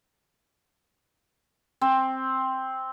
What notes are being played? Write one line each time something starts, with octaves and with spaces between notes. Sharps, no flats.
C4